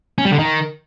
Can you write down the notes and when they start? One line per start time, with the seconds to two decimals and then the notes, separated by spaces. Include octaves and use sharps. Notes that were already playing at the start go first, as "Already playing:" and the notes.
0.18 C#4
0.25 G3
0.32 D3
0.39 D#3